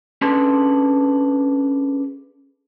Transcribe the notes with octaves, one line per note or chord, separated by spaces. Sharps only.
C#4 D4 G#4 A4 B4 C6